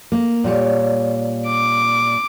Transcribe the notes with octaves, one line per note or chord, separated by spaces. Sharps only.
A#3
A#2 G3 C#5
D6